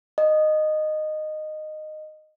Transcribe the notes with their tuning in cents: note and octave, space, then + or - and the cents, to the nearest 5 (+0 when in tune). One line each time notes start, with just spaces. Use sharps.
D#5 -15